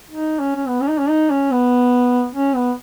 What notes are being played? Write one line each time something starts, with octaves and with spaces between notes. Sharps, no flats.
D#4
C#4
C#4
B3
C#4
D#4
C#4
D#4
C#4
B3
C#4
B3